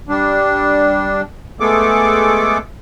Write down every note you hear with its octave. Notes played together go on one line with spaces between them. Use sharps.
G3 D4
G#3 A3 B3 G#4 A4 D6